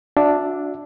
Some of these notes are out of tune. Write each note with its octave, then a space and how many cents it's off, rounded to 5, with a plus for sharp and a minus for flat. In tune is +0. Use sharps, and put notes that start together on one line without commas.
D4 +0 F#4 -35 E5 +0